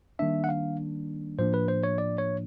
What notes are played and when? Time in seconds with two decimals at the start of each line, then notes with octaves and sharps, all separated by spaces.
0.19 D#3 G3 A#3 D4 E5
0.44 F#5
0.49 F5
1.39 A2 F3 A#3 D4 C5
1.54 B4
1.68 C5
1.83 C#5
1.98 D5
2.18 C#5